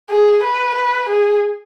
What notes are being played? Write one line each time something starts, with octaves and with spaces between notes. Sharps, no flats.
G#4
B4
B4
G#4